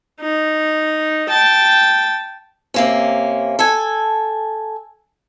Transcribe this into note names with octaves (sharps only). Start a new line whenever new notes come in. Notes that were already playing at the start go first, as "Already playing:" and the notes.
D#4
G5 A5
C3 A#3 C#4
A4 G#5